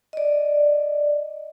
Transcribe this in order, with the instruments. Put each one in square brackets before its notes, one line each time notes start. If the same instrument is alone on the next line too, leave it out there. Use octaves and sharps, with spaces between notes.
[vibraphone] D5 D#5